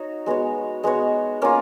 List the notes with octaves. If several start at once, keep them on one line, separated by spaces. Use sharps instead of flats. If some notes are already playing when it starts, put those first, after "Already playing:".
Already playing: D#4 F#4 C#5
G#3 B3 F#4 C#5
G#3 B3 F#4 C#5
A#3 C#4 F4